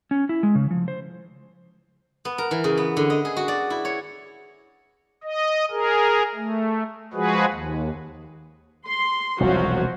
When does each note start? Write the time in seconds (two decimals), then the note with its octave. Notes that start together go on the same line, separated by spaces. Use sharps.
0.11 C#4
0.29 E4
0.43 G#3
0.55 C#3
0.71 F3
0.88 C5
2.25 B3
2.38 A#4
2.51 E3
2.64 C#3
2.78 B3
2.97 D3
3.10 D#5
3.25 G#4
3.37 F#4
3.48 D5
3.70 E4
3.85 C#5
5.23 D#5
5.71 G#4 A#4
6.34 A3
7.13 F3 G#3 F#4 G#4 B4
7.49 D#2
8.86 C6
9.40 E1 C2 F3 F#3 F#4